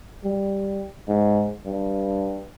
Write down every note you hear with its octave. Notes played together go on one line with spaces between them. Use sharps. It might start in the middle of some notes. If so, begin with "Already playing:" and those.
G3
G#2
G2